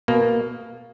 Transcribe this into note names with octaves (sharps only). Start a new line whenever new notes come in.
B2 A#3